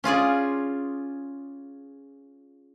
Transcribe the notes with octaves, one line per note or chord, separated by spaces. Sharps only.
C#4 F4 G#4 D5